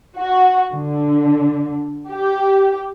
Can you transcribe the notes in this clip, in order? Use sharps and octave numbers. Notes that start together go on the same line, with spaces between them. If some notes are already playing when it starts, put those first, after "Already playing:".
F#4
D3
G4